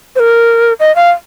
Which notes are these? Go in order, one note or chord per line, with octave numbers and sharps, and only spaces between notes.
C5
A#4
D#5
F5